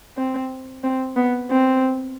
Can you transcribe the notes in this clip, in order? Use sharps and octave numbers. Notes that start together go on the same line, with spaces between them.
C4
C4
B3
C4